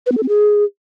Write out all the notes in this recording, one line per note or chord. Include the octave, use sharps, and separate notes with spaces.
B4
B3
A4
C4
G#4